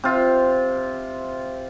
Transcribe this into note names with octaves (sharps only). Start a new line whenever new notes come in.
C3 F4